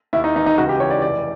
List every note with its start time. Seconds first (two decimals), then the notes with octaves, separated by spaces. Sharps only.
0.13 D#2 E4
0.24 D#4
0.35 E3 D#4
0.46 D#4
0.58 C#2 F#4
0.69 G4
0.79 E3 C#5
0.90 D5
1.02 F1 D5